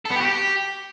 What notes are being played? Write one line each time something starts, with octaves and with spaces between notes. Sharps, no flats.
A4
B3
G4
F#4
G4